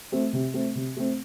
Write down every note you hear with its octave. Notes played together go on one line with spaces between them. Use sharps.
A3 C4
C3
A3 C4
C3
A3 C4